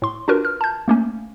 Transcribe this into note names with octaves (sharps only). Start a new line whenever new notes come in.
A2 C6
D4 F4 F#4 A#4 B4
F6
A5 G6
A3 A#3 C#4